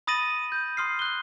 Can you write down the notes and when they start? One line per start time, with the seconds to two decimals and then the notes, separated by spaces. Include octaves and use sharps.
0.07 B5 D#6 A6 A#6 D#7 F#7
0.52 G6
0.77 C6 D#6 F6 C7
0.99 F#6 G7